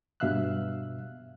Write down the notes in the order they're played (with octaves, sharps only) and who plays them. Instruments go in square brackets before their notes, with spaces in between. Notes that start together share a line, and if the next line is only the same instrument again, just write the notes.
[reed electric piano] G2 B2 E5 F5 E6 F#6